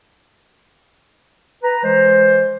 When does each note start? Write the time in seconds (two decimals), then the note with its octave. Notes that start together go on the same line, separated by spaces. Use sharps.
1.63 B4 A#5
1.84 E3 G#3 C5